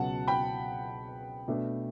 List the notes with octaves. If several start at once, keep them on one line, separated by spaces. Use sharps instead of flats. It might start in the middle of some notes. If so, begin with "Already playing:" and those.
Already playing: C#2 B2 F#3 F#5 A5
G5 B5
B2 A3 D4